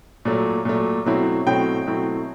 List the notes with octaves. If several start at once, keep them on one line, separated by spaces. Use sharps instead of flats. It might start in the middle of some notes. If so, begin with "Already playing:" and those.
A#2 F#3 A3
A#2 F#3 A3
B2 F#3 A3 C4 E4
B2 F#3 A3 C4 E4 G5
B2 F#3 A3 C4 E4